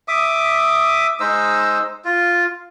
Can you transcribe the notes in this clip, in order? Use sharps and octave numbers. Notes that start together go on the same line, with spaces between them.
E5 D6 D#6
G#3 D#4 C5 E6
F4